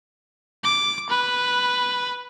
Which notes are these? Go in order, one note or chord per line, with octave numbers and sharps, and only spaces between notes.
D6
B4